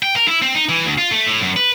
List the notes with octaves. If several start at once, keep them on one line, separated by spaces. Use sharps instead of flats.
G5
A#4
E4
C4
D#4
E3
D2
F4
A3
A2
F#2
B4